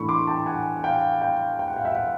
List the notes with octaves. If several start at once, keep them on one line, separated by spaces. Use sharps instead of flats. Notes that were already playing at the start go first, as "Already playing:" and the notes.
Already playing: A2 E3 A3 D4 B5 C#6
C6 D6
G5 A5
F#5 G#5
F#5
F5 G5
F5 G5
G5
F#5
F5
E5 F#5
E5 F#5